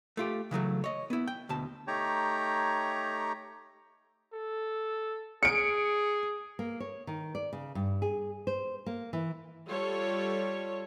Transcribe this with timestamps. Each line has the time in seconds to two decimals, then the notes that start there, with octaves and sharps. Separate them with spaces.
0.17 A3 F4 G4
0.51 C#3 E3 F#3 A3
0.84 C#5 D#5
1.10 B3 E4
1.28 G5
1.49 D2 B2 A5
1.87 A3 D#4 G4 C#5 G5 A#5
4.33 A4
5.43 G#4 C#7 D7
6.59 A#3
6.80 C#5
7.07 D#3
7.35 D5
7.53 C#3
7.75 G2
8.02 G#4
8.47 C5
8.86 A#3
9.13 E3
9.68 G3 F4 A4 C#5